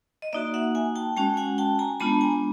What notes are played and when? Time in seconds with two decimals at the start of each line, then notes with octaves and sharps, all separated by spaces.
0.22 D#5
0.33 A#3 D#4 F#4 D5 E5
0.54 E5 F#5
0.75 F#5 G#5
0.96 G5 A5
1.17 G#3 C#4 F#4 G5 A5
1.37 F#5 G#5
1.58 G5 A5
1.79 G#5 A#5
2.00 G#3 B3 D4 F4 A5 B5
2.21 G#5 A#5